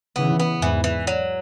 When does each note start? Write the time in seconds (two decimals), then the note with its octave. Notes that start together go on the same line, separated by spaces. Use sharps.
0.16 C#3 E3 B3
0.40 B3
0.61 E2 G#2 E3
0.84 E3
1.07 F#3